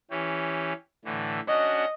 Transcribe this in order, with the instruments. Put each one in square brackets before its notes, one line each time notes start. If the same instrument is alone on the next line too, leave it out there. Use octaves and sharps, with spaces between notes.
[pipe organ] E3 C#4 G4
A2 D3 E3
[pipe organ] C#4 D4 F#4 [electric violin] D#5